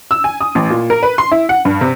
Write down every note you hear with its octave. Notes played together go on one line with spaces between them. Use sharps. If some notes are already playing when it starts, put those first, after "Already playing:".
E6
G#5
D#6
A1
A#2
A#4
B4
C6
E4
F#5
G2
C3